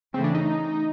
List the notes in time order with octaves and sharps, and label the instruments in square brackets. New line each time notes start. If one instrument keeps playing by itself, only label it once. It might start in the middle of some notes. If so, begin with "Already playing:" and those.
[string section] C#3 E3 A3 [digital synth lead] C4
[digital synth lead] D4
D#4